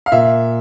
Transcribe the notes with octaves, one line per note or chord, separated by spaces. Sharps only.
F5
A#2 E5